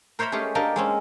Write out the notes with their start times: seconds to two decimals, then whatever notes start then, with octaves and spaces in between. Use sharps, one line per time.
0.19 A#4 C5 C#5 E5 A#5 B5
0.32 G#3 A3 C#4 G4 G#4
0.55 A#3 D4 G4 A4 A#4 D#5
0.76 G#3 C4 C#4